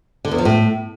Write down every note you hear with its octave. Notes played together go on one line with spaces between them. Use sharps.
D3
E2
F3
A2